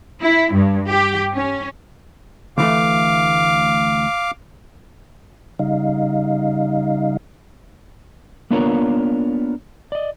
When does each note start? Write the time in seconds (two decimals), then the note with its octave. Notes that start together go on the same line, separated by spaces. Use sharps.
0.21 E4
0.52 G2
0.89 G4
1.34 C#4
2.58 D2 E3 A3 F5 D6
5.59 C#3 G3 D#4 D#5 F5
8.51 A#3 B3 D4 F4 A#4 C#5
9.92 D5 D#5